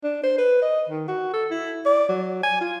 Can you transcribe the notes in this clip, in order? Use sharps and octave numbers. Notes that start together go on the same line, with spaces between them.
D4
C5
B4
D#5
D#3
F#4
A4
E4
D5
F#3
G#5
F4